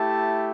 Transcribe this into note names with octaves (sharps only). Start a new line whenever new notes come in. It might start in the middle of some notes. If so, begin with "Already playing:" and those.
Already playing: A3 E4 G4 A5